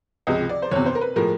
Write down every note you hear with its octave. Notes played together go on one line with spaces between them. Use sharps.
C#2 C3 F3 G#3 D#5
D5
C5
F#1 E2 C3 C#5
C5
A#4
B4
A2 F3 G#3 A#4